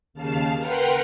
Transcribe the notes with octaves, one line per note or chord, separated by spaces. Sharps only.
D#2 C#3 F5 A5
A#4 B4 F#5 G5 A#5 C6